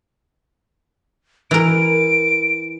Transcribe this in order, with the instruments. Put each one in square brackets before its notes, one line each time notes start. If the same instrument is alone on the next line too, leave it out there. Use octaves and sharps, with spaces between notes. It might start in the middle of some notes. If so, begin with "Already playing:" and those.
[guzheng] E3 A#4 [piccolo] D7